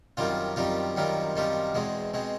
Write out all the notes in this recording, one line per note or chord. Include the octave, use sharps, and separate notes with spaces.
F#2 D#3 G3 C4 F4
F#2 D#3 G3 C4 F4
F#2 D#3 G3 C4 F4
F#2 D#3 G3 C4 F4
E2 B2 G#3 C4
B2 G#3 C4